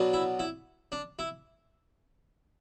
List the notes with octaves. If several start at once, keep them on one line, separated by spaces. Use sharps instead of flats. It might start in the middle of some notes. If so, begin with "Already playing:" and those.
Already playing: B2 F#3 B3 D4
E4
E4
D4
E4